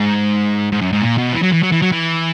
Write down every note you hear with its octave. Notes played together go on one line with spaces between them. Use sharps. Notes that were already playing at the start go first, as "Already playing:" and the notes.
Already playing: G#2
G#2
F#2
G#2
A#2
B2
E3
F#3
E3
F#3
E3
F#3
E3